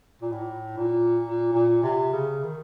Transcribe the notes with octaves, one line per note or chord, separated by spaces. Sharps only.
A#2
A2
A#2
A#2
A#2
C3
C#3
D#3